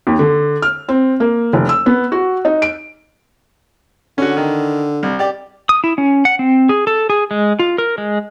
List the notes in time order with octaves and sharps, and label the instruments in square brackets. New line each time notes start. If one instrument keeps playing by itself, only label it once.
[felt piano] D#2
D3
F6
C4
A#3
F1
E6
B3
F#4
D#4
D7
[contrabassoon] D3 [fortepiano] C#4 F#4
[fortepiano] D#3
C2
G4 D5
[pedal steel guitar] D#6
E4
C#4
F#5
C4
G#4
A4
G#4
G#3
F4
A#4
G#3